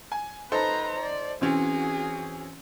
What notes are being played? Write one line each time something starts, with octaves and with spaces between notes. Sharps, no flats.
G#5
D#4 A4 B4 C5 A#5
D5
E3 C4 C#4 F#4 G#4